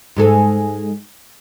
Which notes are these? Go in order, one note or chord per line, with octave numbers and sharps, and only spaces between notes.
G#2 G#3 A4